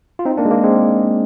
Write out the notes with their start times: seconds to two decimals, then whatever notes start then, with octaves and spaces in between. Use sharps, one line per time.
0.19 F4
0.25 C4 D#4
0.37 A#3 D4
0.45 G#3
0.51 A#3
0.64 G#3 C4